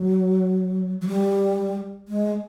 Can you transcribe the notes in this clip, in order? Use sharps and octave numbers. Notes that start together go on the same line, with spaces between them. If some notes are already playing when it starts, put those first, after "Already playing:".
Already playing: F#3
F#3
G3
G#3